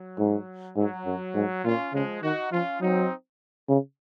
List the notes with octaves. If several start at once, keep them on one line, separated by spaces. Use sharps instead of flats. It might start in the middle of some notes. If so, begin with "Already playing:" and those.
Already playing: F#3
G#2
G#2 F#3
F#2
G#2
A#2 C#4 F4
C#3 F3 G#3
D#3 D#4 F#4
F3 C#4 F4
F#3 C4 D#4
C#3